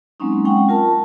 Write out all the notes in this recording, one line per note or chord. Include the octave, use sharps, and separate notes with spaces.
F#3 G#3 A#3 C4 C#4 D#4
G#3 C#4 F#5 G5 C#6
F4 A#4 A5